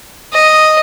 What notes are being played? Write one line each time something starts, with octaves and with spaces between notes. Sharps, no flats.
D#5